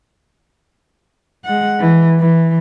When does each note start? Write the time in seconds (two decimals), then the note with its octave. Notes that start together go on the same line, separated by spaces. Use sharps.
1.45 G#3 F#5
1.80 E3
2.20 E3